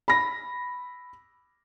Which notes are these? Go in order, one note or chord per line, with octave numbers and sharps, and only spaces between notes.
B5 A#6